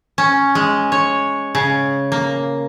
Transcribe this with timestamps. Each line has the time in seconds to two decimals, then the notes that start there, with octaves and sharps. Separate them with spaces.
0.18 C#4
0.55 G#3
0.92 C#5
1.55 C#3
2.12 A#3